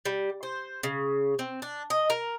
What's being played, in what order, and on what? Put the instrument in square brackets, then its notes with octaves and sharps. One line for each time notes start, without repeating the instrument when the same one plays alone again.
[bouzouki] G3
C5
C#3
C4
D4
D#5
A#4